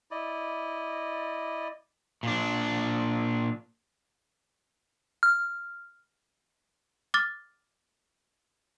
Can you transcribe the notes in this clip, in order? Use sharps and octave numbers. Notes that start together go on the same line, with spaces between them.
E4 D5 D#5
A#2 D4
F6
D6 F6 A6 G7